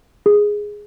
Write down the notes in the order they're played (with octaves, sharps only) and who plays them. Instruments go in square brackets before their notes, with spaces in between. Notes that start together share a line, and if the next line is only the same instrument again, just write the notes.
[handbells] G#4